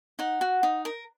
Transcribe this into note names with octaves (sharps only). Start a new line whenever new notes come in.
D#4 F#5
F#4
D#4
A#4